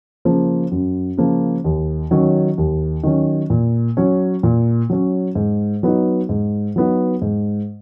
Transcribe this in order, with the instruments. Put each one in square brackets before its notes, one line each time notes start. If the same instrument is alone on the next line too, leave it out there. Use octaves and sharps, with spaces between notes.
[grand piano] C#3 F3 A#3
F#2
C#3 F3 A#3
D#2
D#3 F#3 C#4
D#2
D#3 F#3 C#4
A#2
F#3 C#4
A#2
F#3 C#4
G#2
F#3 B3 D#4
G#2
F#3 B3 D#4
G#2